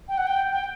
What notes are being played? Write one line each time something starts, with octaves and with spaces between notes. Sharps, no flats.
G5
F#5
G5
G5